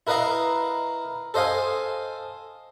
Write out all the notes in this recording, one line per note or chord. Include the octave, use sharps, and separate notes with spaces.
E4 A#4 B4 D#5 F5 A#5
A4 C5 D#5 F5 G#5